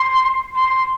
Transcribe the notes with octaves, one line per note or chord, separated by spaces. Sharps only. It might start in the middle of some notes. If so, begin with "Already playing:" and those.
Already playing: C6
C6